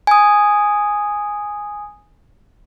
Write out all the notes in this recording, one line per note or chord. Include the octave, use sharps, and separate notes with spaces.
G#5 D#6